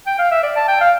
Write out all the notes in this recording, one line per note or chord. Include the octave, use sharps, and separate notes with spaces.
G5
F5
E5
D5
A5
G5
F5